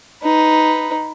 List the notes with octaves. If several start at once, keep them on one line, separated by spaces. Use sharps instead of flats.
D#4 B4